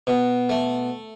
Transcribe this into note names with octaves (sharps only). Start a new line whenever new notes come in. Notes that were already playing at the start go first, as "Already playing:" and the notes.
B2
A3